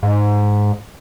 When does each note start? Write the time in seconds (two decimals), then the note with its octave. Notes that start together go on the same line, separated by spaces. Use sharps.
0.03 G#2